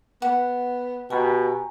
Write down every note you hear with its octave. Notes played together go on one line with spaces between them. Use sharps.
B3 F#5
B2 G4 G#5 A#5